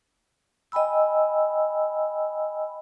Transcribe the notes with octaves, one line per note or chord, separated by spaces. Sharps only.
D#5 G5 G#5 B5 E6